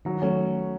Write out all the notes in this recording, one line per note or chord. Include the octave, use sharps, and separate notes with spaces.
D#3 F#3
F#3 A3 C#4